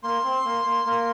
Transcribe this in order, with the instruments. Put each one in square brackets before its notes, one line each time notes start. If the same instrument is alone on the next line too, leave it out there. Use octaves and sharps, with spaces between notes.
[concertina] A#3 [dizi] C6
[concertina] C4
A#3
A#3
A#3